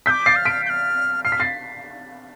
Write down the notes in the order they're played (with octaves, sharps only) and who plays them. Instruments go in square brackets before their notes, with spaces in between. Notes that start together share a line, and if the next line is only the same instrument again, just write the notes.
[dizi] D6 E6 [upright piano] G6 B6
[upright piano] A6 C7
[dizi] F6
[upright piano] B6 D7
[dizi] G6
F6
[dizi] F6 [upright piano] C7
[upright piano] B6
A6 C7